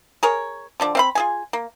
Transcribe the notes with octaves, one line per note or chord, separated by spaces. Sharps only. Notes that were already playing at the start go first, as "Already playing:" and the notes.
G#4 A#4 C#5
D3 F3 D4
C4 F5 B5
F4 G#4 G#5
A#3